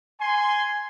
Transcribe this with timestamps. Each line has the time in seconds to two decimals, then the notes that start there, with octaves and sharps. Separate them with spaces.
0.20 G#5 C6